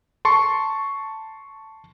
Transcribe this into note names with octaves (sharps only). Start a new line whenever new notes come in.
A5 C6 C#6